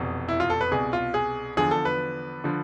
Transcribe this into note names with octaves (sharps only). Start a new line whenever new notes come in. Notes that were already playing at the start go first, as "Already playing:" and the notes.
Already playing: F1 E2 B2
E4
F4
A4
B4
C2 B2 G#4
F4
G#4
E2 D3 F3 G#4
A4
B4
D3 F3